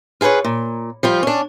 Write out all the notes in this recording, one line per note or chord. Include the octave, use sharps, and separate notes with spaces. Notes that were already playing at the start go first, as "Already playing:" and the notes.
F4 G#4 A4 B4 C#5
A#2
F3 G3 F4
C#4 D4